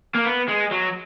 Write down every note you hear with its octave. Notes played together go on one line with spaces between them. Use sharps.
A#3
B3
G#3
F#3